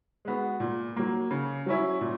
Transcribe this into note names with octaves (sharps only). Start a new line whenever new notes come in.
G#3 B3 F#4
A#2
F#3 A#3
C#3
F#3 C#4 E4
A#2